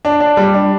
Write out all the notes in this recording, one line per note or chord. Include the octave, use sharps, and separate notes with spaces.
D4
D4
G3
D4